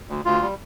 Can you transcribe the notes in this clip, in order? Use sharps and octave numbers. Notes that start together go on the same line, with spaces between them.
D2
D2 F4
G3